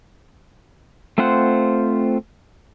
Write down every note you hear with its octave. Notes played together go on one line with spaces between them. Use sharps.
A3 C4 F4 C5 F#5